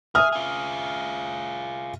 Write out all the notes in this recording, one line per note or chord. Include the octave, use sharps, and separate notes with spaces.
G#4 E5 D#6 F6
F4 G#4